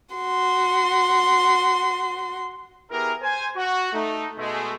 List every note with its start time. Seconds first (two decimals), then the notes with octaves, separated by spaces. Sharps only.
0.15 F#4 C6
2.91 B3 E4 G4 G#4 A#4
3.22 C5 G#5
3.56 F#4
3.93 A3 D#4
4.37 B2 G#3 A3